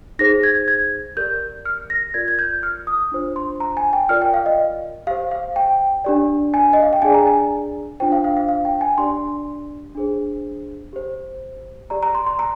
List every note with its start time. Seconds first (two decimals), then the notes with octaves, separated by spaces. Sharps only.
0.19 D#4 G#4 C5 A#6
0.43 G#6
0.68 G#6
1.17 G4 A#4 D5 G6
1.66 F6
1.90 A#6
2.14 F4 A#4 D5 G#6
2.28 G#6
2.39 G6
2.63 F6
2.87 D#6
3.12 D4 F4 C5
3.36 C6
3.60 A#5
3.77 G#5
3.93 G5
4.09 F4 A#4 D5 F6
4.22 G5
4.34 F5
4.46 D#5
5.07 G4 F5
5.11 C5
5.31 F5
5.56 G5
6.04 D4 G4 D5
6.54 G#5
6.73 D#5
6.83 F5
6.93 G5
7.02 D4 G#4 D5 G#5
7.14 A#5
7.27 G#5
8.00 D4 F4 C5 G5
8.12 F5
8.24 F5
8.37 F5
8.48 F5
8.65 G5
8.81 G#5
8.98 D4 G4 D5 C6
9.95 D4 G#4 C5
10.93 G4 C5
11.90 G4 D5 A#5
12.03 A#5
12.15 C6
12.27 C6
12.39 A#5